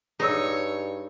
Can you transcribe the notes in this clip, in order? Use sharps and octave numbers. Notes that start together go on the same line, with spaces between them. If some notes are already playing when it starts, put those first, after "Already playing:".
G2 D#4 G#4 C#5 E6